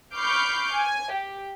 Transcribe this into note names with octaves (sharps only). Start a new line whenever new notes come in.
B5 C#6 D6 F6 G6 C7
G#5
G4